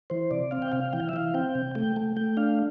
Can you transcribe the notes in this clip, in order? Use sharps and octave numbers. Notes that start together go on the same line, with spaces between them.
E3 C5
C3 D5
C4 F5
G5
C3 F5
E3 G5
F5
E5
E3 F5
C4 G5
C3
A3 G5
A3
A3 G5
D4 F5